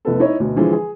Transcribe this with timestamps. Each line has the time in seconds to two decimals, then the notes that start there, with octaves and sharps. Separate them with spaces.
0.05 F1 B3 A4
0.20 D#4 E4 C#5 D#5
0.40 D2 B2
0.56 D3 E3 F3 G#3
0.72 G#4